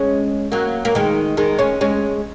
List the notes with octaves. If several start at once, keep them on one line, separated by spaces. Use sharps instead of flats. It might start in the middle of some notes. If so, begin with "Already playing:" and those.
Already playing: G#3 C#4
F#3 A#3
A#3
D#3 G#3
D#3 G#3
G#3 C#4
G#3 C#4